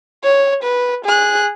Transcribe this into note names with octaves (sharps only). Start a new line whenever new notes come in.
C#5
B4
G#4 F#6